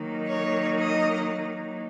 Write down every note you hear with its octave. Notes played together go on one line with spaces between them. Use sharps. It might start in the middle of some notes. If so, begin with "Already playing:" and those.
Already playing: D#3 F#3 A#3 D#4
C#5
D#5